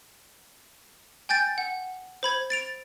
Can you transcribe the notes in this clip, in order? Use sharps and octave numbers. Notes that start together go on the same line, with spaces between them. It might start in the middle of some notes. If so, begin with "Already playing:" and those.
G5 G#5 G6 A6 D7
F#5
C5 B5 G#6
A6 D7 F7